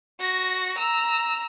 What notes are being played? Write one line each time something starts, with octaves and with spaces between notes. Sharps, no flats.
F#4 A#6
A#5 E6